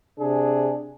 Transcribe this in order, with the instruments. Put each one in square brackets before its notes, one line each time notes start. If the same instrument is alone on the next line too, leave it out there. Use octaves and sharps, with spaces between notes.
[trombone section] C3 D4 G#4